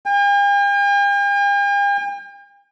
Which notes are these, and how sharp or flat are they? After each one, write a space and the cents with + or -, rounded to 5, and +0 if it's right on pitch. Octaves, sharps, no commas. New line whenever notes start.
G5 +45